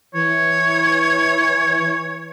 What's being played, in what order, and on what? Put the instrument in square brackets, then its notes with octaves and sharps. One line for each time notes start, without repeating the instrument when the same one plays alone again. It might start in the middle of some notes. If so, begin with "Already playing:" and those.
[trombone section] E3 [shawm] C#5